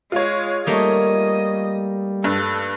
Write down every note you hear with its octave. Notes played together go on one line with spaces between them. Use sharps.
G#3 F4 C#5
G3 A3 A#3 D#4 D#5
G2 A4